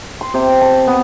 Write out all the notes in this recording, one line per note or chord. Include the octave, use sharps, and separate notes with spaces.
C6
C3
A5
B3